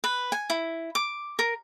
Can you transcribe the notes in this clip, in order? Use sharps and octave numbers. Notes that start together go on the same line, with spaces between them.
B4
G#5
E4
D6
A#4